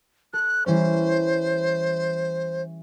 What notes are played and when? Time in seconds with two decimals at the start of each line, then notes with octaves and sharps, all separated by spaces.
0.33 A4 F#6
0.66 E3 G3 C#4 C5